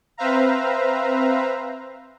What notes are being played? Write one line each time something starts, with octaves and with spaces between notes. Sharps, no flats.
C4 B4 C5 E5 F5 A#5